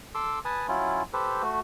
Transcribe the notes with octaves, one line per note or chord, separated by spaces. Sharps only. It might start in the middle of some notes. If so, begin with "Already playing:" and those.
A4 C6 D6 E6
B4 G#5 A5 D#6
F#3 C#4 E4 F4
G4 A4 B4 C5
A3 F#4